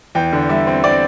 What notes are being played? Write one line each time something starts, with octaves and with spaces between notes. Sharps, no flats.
E2 G5
D3
G3 E5
C4
C4 D5